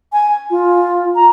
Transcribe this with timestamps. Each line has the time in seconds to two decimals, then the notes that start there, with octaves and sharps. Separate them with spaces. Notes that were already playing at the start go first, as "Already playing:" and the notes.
0.13 G#5
0.51 F4
1.15 A#5